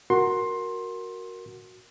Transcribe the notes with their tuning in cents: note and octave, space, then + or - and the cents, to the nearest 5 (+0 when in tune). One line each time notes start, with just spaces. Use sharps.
F#4 +0 A#4 +0 C6 +15